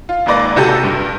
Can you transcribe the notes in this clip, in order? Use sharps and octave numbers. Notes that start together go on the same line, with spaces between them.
F4
G#1 G#2 A#3 B4 D5 A#6
C3 F#4 G4 A4
G2